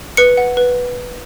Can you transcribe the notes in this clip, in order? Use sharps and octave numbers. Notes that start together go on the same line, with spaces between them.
B4 C#7
F#5
B4